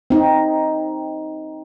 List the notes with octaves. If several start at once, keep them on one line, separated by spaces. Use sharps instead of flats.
C4 D#4